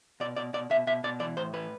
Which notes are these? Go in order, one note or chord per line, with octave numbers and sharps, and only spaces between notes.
B2 D5
B2 D5
B2 D5
B2 E5
B2 E5
B2 D5
E3 D5
A2 C5
E3 B4